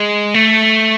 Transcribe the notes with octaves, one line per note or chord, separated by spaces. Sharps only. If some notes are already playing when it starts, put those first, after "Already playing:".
Already playing: G#3
A3